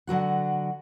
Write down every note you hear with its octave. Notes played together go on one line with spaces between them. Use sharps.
D3 F#3 F#4 F#5